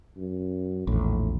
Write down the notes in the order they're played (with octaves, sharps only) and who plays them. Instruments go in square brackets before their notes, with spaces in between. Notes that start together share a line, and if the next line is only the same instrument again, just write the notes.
[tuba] F#2
[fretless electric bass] A#1 E2 [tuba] A2